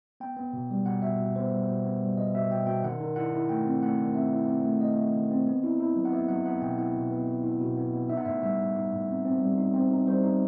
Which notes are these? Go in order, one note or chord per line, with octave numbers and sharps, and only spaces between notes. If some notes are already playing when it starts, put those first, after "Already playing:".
B3 G5
B3
B2
G3
B2 F#5
B2 E5
B2
B3 C5
G3
B2
B3
G3
B2 D#5
B2 E5
B2 G5
B2 G5
D#3 F#5
D#3
E4 F#5
E4
A3 G5
C4
A3 F#5
D#3
C4 E5
E4
C4
A3
A3 D#5
A3
D#3
C4
B3
E4
E4
F#3
F#5
B3 E5
F#3 F#5
B3 F#5
B2 G5
E4 F#5
B2
B3
B3
E4
B2
B3
B3
D#4 E5
F#5
A2 E5
G3 E5
D#4
D#4
A2
C4
C4
G3
D#4
C4
D#4
G3 C5
D#4